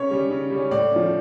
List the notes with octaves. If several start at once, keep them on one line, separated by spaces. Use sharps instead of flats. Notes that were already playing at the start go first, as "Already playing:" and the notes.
Already playing: C#3 C#5
G3 C#4
C#3
G3
C#4
A2 D5
F3 C#4